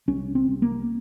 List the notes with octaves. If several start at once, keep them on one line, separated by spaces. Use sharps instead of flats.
C2 C#4
C4
C2
A#3